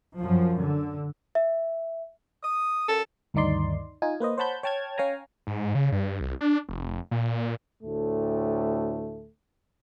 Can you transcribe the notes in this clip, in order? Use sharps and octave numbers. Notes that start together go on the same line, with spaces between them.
F#2 F3
D3
E5
D#6
F#2 A4
D2 G2 D#3 D#4 D5 C6
D#4 F4 G#5
A#3 B4 C5 D#5
C5 C#5 F#5 A5 B5 G6
C#5 G5 A5 F6 G#6
C#4 C#5 F5 G5 G#5 A#5
G#2
C#3
G2
C2
D4
F1
A#2
D2 A2 A3